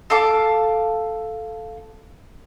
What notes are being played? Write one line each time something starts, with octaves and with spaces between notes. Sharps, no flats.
A4 F5 A5 D6